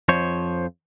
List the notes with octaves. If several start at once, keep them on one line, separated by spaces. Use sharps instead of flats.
F2 F3 C5 C#5